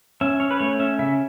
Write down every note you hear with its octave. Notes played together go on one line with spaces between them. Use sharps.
C#4 E5
C#4 C#5
B4
A3 C#5
C#4 E5
C#3 E5